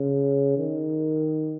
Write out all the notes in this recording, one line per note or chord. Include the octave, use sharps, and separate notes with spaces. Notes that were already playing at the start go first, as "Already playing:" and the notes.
Already playing: C#3
D#3